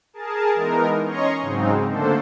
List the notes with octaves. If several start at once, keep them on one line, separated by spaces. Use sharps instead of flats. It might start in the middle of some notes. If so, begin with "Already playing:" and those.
G#4 A#4 A5
E3 G#3 B3 D#4 A#4
C#4 C#5 D#5 A#5 C6 C#6
G#2 C#3 F#3 G#3 C4 D#4
D3 A3 A#3 D4 A4 C5